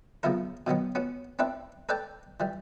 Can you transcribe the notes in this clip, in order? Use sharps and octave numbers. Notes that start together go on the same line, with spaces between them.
C#3 F3 F#3 B3 E4 A#4
B2 D#3 F#3 B3
B3 C#4 F#4
C4 D4 E4 B4
A4 B4 D5 G5 A5
E3 G3